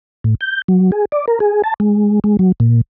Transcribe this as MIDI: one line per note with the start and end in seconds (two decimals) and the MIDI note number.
0.24 0.35 45
0.41 0.62 91
0.68 0.91 54
0.92 1.05 68
1.12 1.25 74
1.28 1.39 70
1.40 1.62 68
1.64 1.74 81
1.80 2.20 56
2.24 2.37 56
2.39 2.52 54
2.60 2.81 46